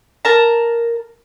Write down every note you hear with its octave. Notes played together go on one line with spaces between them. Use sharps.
A#4 A5 A#5